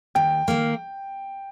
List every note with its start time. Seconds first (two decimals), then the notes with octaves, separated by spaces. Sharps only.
0.15 D#2 G5
0.48 D#3 A#3